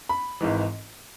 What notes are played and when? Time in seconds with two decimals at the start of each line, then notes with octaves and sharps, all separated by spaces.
0.09 B5
0.41 G#1 G#2 E3